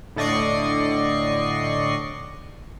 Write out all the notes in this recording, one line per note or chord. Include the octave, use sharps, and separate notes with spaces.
A2 D3 D5 D#5 C#6 C7